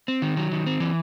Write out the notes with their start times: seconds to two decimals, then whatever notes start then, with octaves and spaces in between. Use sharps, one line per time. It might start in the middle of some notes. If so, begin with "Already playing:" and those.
0.08 C4
0.22 D#3
0.37 F#3
0.52 D#3
0.66 C4
0.80 E3